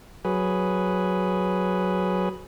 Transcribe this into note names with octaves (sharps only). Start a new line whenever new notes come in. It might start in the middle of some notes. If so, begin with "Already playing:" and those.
F#3 G#4 B4